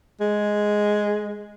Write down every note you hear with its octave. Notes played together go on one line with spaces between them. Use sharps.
G#3